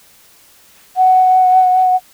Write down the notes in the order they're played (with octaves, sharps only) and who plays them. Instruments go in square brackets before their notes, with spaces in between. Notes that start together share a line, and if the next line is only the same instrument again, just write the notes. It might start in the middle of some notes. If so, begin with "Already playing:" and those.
[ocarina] F#5